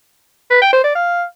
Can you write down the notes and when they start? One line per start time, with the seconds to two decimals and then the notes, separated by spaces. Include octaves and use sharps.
0.51 B4
0.62 G5
0.73 C5
0.84 D5
0.95 F5